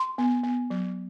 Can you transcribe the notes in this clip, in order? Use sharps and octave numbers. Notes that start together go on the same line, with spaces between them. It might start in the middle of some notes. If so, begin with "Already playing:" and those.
Already playing: C6
B3
B3
F#3